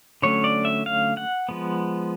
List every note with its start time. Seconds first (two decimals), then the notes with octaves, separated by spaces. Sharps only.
0.22 D3 F#3 A3 C#4 C#5
0.44 D5
0.65 E5
0.86 F5
1.17 F#5
1.49 F3 G#3 B3